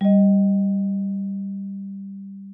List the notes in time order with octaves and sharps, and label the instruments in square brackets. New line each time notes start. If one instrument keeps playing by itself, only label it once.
[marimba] G3 D#5